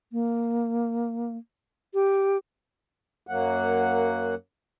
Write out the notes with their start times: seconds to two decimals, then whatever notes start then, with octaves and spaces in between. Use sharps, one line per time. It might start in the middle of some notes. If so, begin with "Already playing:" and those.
0.12 A#3
1.94 G4
3.27 F#2 F#3 A#3 F#5